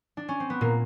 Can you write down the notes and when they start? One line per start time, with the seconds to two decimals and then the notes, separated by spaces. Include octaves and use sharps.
0.17 D4
0.29 C#4
0.40 C4
0.50 B3
0.61 A#2 A#3